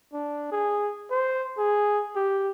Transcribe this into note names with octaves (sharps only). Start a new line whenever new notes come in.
D4
G#4
C5
G#4
G4